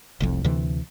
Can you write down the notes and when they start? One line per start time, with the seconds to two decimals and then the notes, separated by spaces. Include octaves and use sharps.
0.20 F1 C2 F2
0.45 D2 C3 E3